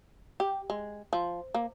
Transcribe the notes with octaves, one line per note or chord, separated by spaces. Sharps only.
G4
G#3
F3
A#3